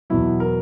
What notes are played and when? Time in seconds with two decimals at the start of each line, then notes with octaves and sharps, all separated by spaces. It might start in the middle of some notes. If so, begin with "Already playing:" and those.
0.10 E2 B2 F#3 E4
0.40 A#4